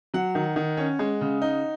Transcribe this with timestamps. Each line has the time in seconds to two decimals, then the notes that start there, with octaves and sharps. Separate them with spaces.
0.14 F#3 F#5
0.35 D#3
0.56 D#3
0.77 C#4
0.99 G#3
1.21 C#3
1.42 D#4